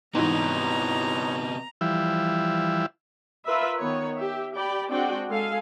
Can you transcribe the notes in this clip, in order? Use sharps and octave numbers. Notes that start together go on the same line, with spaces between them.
G#2 C3 E3 G3 B3 D#4 C#5 A#5
E3 F3 G3 E4
F4 A#4 B4 E5
D#3 B3 C#5
G4 E5
G4 D5 G5 B5
G#3 C4 D4 F#4 D5 G5
G#3 A4 F5 G#5